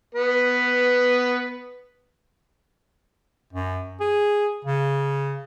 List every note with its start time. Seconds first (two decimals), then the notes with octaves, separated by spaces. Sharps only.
0.15 B3 B4
3.53 F#2
4.00 G#4
4.65 C#3